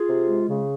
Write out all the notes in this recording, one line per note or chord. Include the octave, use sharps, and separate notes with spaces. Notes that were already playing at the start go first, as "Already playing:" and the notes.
Already playing: F4 G#4
C3
G#3
C#3